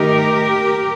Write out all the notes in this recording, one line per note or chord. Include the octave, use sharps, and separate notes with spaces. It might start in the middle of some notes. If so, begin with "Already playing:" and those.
Already playing: D#3 A3 D#4 G4 A#4